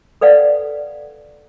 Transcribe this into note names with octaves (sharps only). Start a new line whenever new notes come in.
A4 B4 D5 F5 F#5